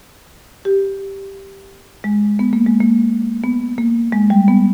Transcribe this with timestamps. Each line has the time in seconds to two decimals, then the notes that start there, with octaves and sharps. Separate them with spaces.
0.65 G4
2.04 G#3
2.39 B3
2.53 A#3
2.67 G#3
2.81 A#3
3.44 B3
3.78 A#3
4.12 G#3
4.30 G3
4.48 B3